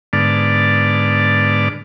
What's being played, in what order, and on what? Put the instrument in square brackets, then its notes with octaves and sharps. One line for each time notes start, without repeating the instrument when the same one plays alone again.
[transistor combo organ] G#2 D3 B3 D5 A5 F6